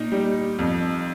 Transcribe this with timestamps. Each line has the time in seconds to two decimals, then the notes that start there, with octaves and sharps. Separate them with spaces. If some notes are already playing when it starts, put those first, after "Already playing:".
Already playing: A#2 D#4
0.12 G3
0.59 F2